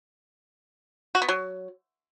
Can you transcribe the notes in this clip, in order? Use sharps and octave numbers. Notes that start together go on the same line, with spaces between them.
F#4
B3
F#3